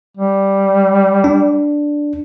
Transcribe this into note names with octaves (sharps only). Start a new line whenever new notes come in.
G3
D4